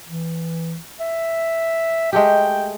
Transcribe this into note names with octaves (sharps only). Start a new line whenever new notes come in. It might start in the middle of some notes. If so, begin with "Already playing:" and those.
E3
E5
G#3 A3 G4 G5